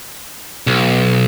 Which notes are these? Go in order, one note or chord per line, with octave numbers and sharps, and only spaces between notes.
B1